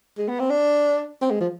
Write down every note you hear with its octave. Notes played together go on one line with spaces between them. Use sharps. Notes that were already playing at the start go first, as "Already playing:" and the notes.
G#3
B3
C4
D4
C4
G#3
F3